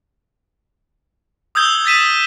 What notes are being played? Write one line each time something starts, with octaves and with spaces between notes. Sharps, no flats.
D#6 E6 G6 G#6 G7
G6 A6 B6 D#7 E7